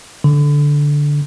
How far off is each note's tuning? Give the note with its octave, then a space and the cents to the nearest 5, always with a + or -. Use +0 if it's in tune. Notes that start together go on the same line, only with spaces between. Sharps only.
D3 -5